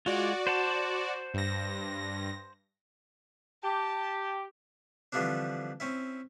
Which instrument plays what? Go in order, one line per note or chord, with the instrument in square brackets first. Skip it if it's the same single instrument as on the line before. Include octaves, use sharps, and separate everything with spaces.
[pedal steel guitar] G#3 F4 [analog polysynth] F#4 D5
[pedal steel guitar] C5 F#5 A5
[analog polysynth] G2 A#6
[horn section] G4 [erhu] A5
[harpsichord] D3 E3 F3 G3 C4 D4
C4 C#4 E4